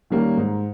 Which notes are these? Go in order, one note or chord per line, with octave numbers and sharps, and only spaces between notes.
D#3 G3 A#3 C#4
G#2